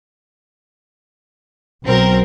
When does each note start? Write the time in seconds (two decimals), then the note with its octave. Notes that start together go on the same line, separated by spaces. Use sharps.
1.84 B1 F#3 C4 A#4